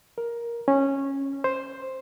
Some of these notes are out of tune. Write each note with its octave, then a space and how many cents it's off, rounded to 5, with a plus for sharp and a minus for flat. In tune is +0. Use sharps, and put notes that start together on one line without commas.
A#4 +10
C#4 -15
C5 +5